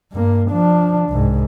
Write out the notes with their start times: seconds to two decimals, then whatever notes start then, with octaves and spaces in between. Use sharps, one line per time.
0.12 G2 A#3
0.50 F3 D4
1.10 C2 G#2